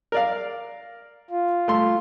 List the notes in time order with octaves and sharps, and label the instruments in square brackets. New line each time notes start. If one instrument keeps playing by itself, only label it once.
[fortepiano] A#4 D5 F5
[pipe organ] F4
[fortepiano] A3 C6